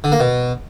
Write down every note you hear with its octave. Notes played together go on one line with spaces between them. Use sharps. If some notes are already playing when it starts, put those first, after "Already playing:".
D3
A#3
B2